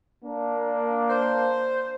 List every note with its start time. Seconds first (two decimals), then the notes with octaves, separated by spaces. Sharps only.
0.24 A#3 D4
1.10 C5